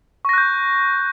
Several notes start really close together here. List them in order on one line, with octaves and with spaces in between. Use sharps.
C#6 A#6 F#6 G6